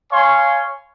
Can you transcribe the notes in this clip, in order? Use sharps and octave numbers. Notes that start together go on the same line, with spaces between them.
C#5 F5 G#5 C6